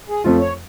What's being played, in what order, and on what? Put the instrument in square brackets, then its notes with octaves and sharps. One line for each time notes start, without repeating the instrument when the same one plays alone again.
[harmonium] G#4
[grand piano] F2 F3 A3 F4
[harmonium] C#5